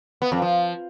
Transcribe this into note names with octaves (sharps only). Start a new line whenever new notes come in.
B3
F2
F3